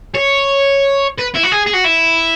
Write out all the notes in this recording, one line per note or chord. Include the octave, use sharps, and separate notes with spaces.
C#5
B4
E4
F#4
G#4
G#4
F#4
E4